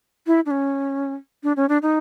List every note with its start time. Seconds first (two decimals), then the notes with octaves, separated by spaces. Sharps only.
0.27 E4
0.46 D4
0.51 C#4
1.43 D4
1.57 C#4
1.69 D4
1.82 D#4